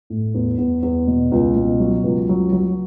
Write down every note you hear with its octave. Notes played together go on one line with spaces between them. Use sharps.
A2
E2
E2
E2
B2
C#2
B2
F#3
C#2
F#3
F#3